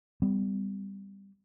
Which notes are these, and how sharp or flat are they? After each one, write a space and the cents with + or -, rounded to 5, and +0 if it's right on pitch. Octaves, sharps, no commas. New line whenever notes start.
G3 +10 B3 +45